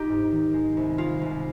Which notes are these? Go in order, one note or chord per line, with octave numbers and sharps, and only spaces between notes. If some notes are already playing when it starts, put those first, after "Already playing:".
Already playing: D#4 F4 G4
G#2
D#3
G#3
C2
G#3 F4
C2